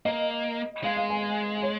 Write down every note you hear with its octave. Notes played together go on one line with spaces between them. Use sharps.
A#3 D#5
G#3 F5
F5
G#5
C#5